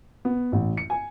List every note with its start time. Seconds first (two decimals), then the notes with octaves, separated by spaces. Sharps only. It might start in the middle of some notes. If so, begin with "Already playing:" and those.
0.25 B3
0.52 A1
0.77 C#7
0.90 G#5